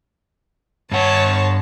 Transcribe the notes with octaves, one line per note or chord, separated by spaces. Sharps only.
G2 C#5 F#5 A5